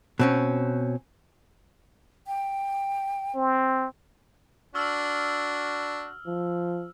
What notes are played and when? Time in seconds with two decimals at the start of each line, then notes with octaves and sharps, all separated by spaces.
0.19 B2 C4 C#4
2.27 G5
3.35 C4
4.75 D4 F#4 E6 F6
6.27 F3